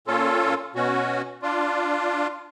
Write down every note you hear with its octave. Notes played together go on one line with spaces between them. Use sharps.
A#2 C#4 F4 A4
B2 C#4 F#4
D4 F4